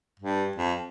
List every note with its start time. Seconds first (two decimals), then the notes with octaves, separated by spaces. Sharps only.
0.20 G2
0.56 F2